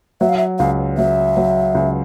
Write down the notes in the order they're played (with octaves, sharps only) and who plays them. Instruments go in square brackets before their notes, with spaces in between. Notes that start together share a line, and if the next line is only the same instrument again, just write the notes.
[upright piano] F#3 [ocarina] E5
[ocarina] F5
E5
[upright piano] C#2 [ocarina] F5
[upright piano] F#3 [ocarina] E5
[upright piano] F#3
C#2